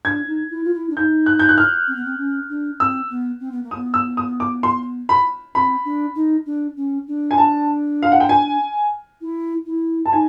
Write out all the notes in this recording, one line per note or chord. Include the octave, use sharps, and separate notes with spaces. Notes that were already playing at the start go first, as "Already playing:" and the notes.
D4 G#6
D#4
E4
F4
E4
D4
D#4 G6
F#6
G6
F#6
F6
C4
B3
C4
C#4
D4
C4 E6
B3
C4
B3
A#3
D#6
B3
E6
D#6
D6
C6
B5
C4 B5
D4
D#4
D4
C#4
D4
G#5
A5
F5
F#5
G5
G#5
E4
E4
A5
D#4 G#5